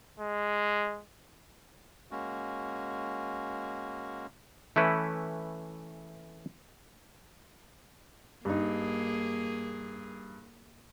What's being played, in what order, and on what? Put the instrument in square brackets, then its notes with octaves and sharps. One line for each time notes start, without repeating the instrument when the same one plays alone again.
[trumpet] G#3
[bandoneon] G#3 A#3 C#4 F#4
[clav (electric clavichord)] E3 A3 C#4 E4 B4
[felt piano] G2 D#4 [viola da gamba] A#3 G#4